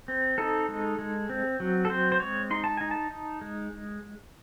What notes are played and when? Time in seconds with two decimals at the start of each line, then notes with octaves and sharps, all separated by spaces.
0.08 C4
0.38 D#4 A4
0.68 G#3
0.99 G#3
1.29 C4
1.60 F#3
1.85 A4
1.90 C4 C5
2.12 C5
2.20 G#3 C#5
2.50 D#4 C6
2.64 A5
2.77 D#4 G#5
2.91 A5
3.11 D#4
3.41 G#3